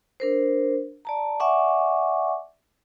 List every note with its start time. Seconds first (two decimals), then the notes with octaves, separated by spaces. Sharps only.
0.20 D4 A#4 C5
1.05 D5 A5 A#5
1.40 D5 E5 F#5 G#5 C#6 D6